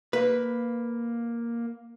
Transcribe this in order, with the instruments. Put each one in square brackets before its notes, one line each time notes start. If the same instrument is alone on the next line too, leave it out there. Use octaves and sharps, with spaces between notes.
[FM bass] A#3 [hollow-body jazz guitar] B4